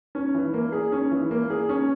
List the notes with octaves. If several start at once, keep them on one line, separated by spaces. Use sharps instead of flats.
C#4
E3
A#3
G#4
C#4
E3
A#3
G#4
C#4